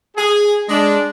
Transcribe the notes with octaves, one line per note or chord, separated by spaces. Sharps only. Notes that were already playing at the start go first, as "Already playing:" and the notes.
G#4
G#3 D4